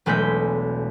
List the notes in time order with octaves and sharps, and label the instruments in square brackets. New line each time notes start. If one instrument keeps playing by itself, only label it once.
[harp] E1 B1 G#3 A3 G6 B6